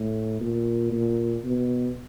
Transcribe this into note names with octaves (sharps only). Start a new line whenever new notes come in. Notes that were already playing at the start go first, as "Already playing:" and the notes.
Already playing: A2
A#2
A#2
B2